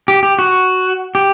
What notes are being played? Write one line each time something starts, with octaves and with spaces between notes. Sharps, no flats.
G4
G4
F#4
G4